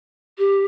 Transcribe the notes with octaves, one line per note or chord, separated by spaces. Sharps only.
G4